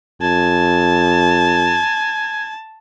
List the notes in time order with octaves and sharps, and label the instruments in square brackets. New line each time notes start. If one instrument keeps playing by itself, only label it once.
[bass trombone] F2 [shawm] G#5 [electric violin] A5